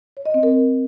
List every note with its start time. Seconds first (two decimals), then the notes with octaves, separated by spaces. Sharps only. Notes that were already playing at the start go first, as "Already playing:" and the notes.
0.17 C#5
0.26 D#5
0.34 C4
0.43 A#4